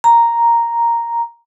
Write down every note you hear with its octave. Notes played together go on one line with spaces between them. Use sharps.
A#5